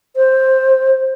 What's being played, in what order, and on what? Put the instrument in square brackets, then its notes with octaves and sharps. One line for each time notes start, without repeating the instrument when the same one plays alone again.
[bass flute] C5